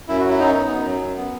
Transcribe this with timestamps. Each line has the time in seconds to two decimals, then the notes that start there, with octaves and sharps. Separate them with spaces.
0.08 F#2 E4
0.20 F#3 F#4
0.29 E4
0.39 F#2 D#4
0.55 B3
0.70 F#2
0.86 F#3
1.02 F#2
1.17 B3